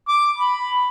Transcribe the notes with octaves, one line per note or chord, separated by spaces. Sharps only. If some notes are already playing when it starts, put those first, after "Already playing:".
D6
B5